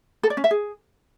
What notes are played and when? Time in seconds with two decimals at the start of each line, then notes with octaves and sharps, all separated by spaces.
0.23 A4
0.30 D5
0.37 C#4
0.44 E5
0.51 G#4